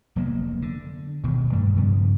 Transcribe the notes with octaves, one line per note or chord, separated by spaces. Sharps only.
F1 F#3 A#3 B3
D3
E1 B2 D#3
G2 G3 A3
G2 C#3 F3 B3